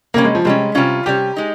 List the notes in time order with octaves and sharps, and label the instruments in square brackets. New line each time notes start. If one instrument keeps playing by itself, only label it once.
[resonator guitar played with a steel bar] C3 G3 C#4 [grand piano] A#3
[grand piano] G#3
F3
[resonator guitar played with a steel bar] C3 G3 C#4 [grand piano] G#3
[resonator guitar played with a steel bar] C3 G3 C#4 [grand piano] F4
[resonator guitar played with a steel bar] C3 G3 C#4 [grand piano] G4
[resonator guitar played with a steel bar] G#3 D#4